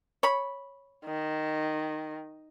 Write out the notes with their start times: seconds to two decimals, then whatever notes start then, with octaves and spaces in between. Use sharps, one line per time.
0.23 C#5 B5
1.05 D#3